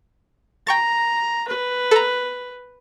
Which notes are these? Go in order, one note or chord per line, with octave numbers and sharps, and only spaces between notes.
G5 A#5 C#6 A6
B4
A4 A#5